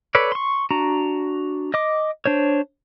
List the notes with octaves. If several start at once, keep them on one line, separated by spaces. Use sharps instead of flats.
A4 B4 C#5 D5
C6 C#6
D4 F#4 A#5
D#5 D6
D4 C5 C#5